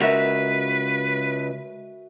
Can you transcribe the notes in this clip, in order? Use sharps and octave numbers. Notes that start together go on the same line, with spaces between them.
C#2 F#4 A#4 B4 E5